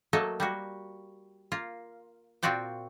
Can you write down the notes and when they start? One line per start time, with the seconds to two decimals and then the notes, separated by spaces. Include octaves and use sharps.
0.13 F#3 A3 A#3 A4 D#5
0.40 G3 A#3 F#4
1.52 A#3 F4
2.43 A#2 C4 F4 F#4 D5 G5